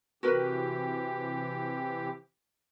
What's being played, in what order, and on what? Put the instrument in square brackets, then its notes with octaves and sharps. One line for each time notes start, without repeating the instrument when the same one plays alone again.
[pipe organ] C3 E3 G4 [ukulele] F#4 A#4 B4